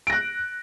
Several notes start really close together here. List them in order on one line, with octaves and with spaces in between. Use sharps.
D7 A#6 F#6